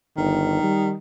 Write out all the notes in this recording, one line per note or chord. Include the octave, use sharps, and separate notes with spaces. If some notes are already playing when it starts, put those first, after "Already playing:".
G1 D#3
G3